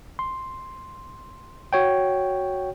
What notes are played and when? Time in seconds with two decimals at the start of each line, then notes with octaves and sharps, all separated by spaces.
0.19 C6
1.73 F#4 C#5 G5